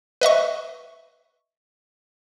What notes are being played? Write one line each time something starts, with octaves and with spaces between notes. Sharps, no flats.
B4 D#5 E5 C#6